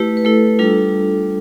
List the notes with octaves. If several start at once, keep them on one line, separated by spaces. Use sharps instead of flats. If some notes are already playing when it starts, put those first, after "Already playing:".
Already playing: A3 E4 G4 B4
B4
A3 E4 A4
G3 D4 F4 A4